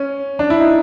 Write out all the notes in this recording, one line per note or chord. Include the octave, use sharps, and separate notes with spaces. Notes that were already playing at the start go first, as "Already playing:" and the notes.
Already playing: C#4
D4
E4
D#4